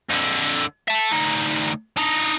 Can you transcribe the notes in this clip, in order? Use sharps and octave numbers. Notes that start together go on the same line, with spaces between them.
F2 D3
E5 A5
D2 D#4
D4 D#4